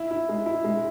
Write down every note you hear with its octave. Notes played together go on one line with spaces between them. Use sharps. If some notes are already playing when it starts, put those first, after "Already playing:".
Already playing: E4
E4
G#3
E4
G#3